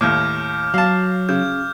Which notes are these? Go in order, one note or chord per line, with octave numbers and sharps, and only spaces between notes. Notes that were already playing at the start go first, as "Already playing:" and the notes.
D#2 A2 D6 F6 G6
F#3 F5 A5
C#3 G6